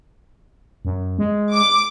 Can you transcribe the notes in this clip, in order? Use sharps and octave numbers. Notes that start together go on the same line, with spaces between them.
F#2
G#3
D6